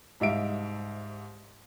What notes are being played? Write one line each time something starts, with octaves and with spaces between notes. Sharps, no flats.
C2 G#2 D#4 E5 F5 D7